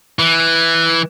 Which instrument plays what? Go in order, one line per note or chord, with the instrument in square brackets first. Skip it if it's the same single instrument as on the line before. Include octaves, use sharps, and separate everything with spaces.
[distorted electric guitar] E3